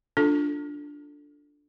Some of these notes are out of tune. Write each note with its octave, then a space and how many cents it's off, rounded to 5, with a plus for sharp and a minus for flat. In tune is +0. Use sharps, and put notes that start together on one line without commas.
D4 -5 F4 +5 A4 +0